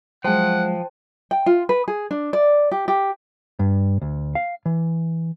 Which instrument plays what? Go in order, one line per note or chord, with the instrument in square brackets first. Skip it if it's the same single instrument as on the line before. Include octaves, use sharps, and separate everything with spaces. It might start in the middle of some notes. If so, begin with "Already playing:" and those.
[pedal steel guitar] F3 [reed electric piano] F#3 G#3 [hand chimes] C5 G5 A5 [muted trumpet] F#5
[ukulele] G5
F4
B4
G#4
D4
D5
G4
G4
[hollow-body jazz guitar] G2
D2
F5
E3